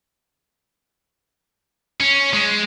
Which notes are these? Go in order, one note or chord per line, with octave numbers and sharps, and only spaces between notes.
C#4
G#3